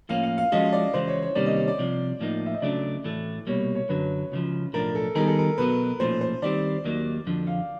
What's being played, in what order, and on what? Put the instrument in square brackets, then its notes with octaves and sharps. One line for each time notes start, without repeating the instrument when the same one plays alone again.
[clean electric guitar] A2 F3 A#3 C#4 [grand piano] F5
[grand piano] F5
F5
[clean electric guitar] F3 G#3 C#4 F#4 A4 [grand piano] D#5
[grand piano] D5
[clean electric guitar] C#2 C#3 E3 G#3 [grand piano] C5
[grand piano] C#5
C#5
[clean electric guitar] C3 D#3 G3 A#3 C#4 [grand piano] D5
[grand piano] D#5
D#5
D5
[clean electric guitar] C2 C3 F3
A2 F3 A#3 D#4
[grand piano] E5
D#5
[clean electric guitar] C#3 F#3 A3 D4 [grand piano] D5
[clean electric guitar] A2 E3 A3
[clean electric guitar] C2 B2 G3 A#3 [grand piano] C#5
[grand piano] C#5
[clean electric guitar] F#2 D3 F#3 [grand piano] B4
[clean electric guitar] C#2 C#3 F3
[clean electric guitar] B1 A2 F3 A3 D4 [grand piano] A#4
[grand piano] A4
[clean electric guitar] D#3 G3 B3 D#4 G#4 [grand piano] A#4
[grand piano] A4
A#4
[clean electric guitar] B2 F#3 B3 [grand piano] B4
[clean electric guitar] B1 A#2 F3 A3 C#4 [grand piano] C5
[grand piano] C5
[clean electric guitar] D#3 G3 C4 [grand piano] D5
[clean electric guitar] D#2 D#3 F#3 A#3
F2 D3 F3
[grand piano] F5